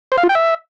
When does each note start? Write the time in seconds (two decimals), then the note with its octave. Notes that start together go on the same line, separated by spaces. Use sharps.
0.12 C5
0.18 F5
0.23 F4
0.29 G5
0.35 E5